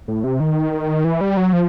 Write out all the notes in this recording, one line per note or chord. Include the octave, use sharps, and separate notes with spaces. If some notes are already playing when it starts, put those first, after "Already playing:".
A2
C3
D#3
E3
G3
F#3
F3